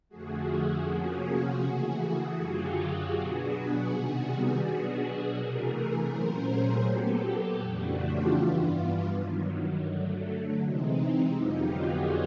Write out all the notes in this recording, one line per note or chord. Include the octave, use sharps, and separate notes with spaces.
F2 D3 F3 A3 F#4 G#4
C3 F3 A#3 C#4
C#3 E3 A3
F#2 D3 F#3 F4 G4
B2 F#3 B3 D4 F#4 G#4
C3 D#3 G3 B3 F#4 G#4
B2 F#3 B3 D4
C3 E3 A3 G#4 A#4
A#2 F#3 A3 C#4 A#4 C5
G#4 A#4
A#2 F#3 B3 G4 A4
F2 C#3 E3 A3 D4 F#4
F4 G4
G2 E3 G3 B3 F4
G2 D#3 F#3
D3 F#3 A3
C3 E3 G#3 C4 D#4
F2 D3 F#3 B3 D#4 F4 G4
F#4 G#4